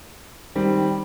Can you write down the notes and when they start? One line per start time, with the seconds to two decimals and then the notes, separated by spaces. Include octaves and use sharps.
0.55 D#3 G3 C4